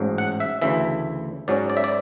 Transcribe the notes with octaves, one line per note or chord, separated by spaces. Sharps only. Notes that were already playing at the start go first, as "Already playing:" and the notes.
Already playing: A1 G#2 F#3
F#5
E5
D2 C#3 E3 E5
G#2 F#3 C#4 D5
D5
E5
D5